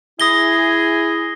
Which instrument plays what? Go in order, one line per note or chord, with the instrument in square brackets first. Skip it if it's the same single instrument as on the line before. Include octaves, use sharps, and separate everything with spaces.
[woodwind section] E4 G#4 [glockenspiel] D#6 A#6 G7